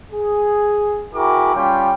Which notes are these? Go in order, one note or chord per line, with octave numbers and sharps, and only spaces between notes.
G#4
E4 F#4 G#4 A#4 G5 D6
G3 C#4 F4 G4 C#5 G5